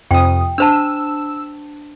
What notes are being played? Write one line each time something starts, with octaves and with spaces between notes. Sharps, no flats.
F2 C3 G5 D#6
D4 C5 A5 E6